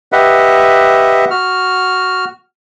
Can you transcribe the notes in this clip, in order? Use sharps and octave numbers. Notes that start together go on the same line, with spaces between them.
G4 B4 D#5 E5 F#5
F#4 F6